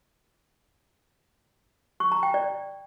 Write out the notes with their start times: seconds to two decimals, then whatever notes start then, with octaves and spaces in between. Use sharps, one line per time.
2.00 C#6
2.12 A#5
2.23 G5
2.34 D5